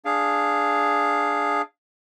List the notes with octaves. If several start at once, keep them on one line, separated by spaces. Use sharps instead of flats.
D4 G#4 F5